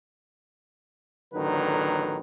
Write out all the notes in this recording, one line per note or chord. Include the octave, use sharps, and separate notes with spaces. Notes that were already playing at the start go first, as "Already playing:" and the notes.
A1 D3 D#3 F#3 B4